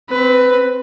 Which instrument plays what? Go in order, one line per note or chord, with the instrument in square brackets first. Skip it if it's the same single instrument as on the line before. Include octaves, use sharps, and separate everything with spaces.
[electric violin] C4 B4